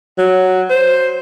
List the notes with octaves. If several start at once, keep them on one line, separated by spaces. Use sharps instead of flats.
F#3
C5